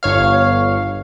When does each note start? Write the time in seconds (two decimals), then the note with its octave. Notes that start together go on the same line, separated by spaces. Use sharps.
0.03 G1 C#5 F5